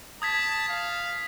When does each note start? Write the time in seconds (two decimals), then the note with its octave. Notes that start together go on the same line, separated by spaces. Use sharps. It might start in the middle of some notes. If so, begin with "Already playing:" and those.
0.22 A5 D#6 G#6 B6
0.69 F5